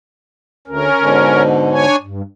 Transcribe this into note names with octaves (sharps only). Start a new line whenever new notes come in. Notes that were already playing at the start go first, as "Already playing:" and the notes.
D2 C#4 A#4
G#2 B2 D3
D4 C#5 G#5
G2